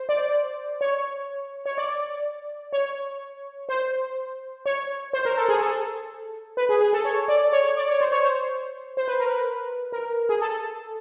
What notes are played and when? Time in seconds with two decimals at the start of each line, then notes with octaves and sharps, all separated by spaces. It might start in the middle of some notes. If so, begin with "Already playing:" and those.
Already playing: C5
0.09 D5
0.81 C#5
1.66 C#5
1.78 D5
2.73 C#5
3.69 C5
4.66 C#5
5.13 C5
5.25 A#4
5.37 A4
5.48 G#4
5.61 A4
6.57 B4
6.69 G#4
6.81 G#4
6.93 A4
7.05 C#5
7.28 D5
7.53 C#5
7.65 C#5
7.77 D5
7.89 C#5
8.01 C5
8.12 C#5
8.24 C5
8.97 C5
9.08 B4
9.19 A#4
9.30 B4
9.92 A#4
10.29 G#4
10.41 A4